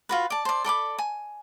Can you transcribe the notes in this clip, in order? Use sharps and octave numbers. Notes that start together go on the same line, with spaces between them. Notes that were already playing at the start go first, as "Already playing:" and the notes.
F4 F#4 B4
D5 A5
C5 D5
A4 D5 B5 D6
G#5